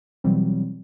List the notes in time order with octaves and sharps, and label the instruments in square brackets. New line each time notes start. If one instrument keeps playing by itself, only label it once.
[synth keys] B2 E3 F#3 G3 C4